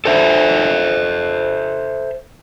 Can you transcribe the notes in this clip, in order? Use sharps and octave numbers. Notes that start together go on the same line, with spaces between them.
A4 C5 E5